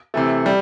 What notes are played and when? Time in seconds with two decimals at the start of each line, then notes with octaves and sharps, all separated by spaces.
0.14 C3 E3 A3
0.46 G3